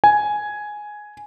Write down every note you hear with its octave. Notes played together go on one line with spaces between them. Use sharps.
G#5